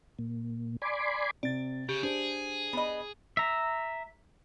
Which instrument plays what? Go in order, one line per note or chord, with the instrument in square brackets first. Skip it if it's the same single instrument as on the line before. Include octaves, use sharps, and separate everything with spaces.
[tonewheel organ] A#2
D5 G#5 B5 C6 D6
[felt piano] C3 [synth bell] D5 A6
[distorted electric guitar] C#3 [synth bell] G4
[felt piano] D4 C5 [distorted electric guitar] G#4
[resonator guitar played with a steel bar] B3 D#5
[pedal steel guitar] E5 A#5